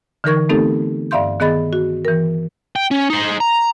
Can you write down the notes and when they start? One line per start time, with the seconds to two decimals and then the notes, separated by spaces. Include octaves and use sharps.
0.24 D3 E3 D#4 A#4 C#6 G#6
0.49 A3 B3 C4 D#4 G4 A4
1.11 G2 D5 E5 F5 C6 G6
1.40 D#3 B3 G#4 D#5 B5 A6
1.73 F#4
2.05 E3 A#4
2.76 G5
2.91 C#4
3.10 D#4 C5
3.40 A#5